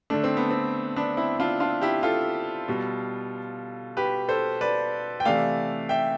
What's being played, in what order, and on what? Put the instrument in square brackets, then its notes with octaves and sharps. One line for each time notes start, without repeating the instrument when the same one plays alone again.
[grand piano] D3 A3 D4
C4
B3
C4
B3 D4
C4 E4
D4 F4
D4 F4
E4 G4
F4 A4
B2 G3
G4 B4
A4 C5
B4 D5
G5
C3 E3 A3 D5 F5
E5 G5